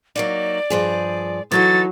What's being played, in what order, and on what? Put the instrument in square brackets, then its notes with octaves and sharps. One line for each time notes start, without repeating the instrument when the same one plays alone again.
[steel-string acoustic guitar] F#3 A#3 D#4 [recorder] D5
[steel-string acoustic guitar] G2 F3 G#4
[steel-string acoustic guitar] E3 D#4 A4 [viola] F#3 [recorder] A6